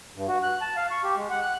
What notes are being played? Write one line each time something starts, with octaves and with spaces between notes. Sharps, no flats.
G2
F#4
F#6
A5
F5
C#6
G4
G#3
F#5
F#6